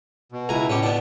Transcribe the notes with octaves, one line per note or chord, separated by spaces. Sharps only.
B2
C#2 E4 G#5 A#5
A2 C#4 G4
B3 D4